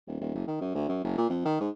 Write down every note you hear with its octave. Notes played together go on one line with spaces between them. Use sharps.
D#1
D#1
F#1
D#3
F#2
D2
F#2
F#1
A#2
F2
D#3
G#2